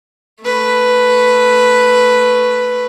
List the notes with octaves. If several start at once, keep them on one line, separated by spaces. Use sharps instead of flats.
A3 B4